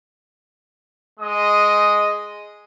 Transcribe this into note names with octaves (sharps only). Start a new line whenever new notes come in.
G#3 D#5 D#6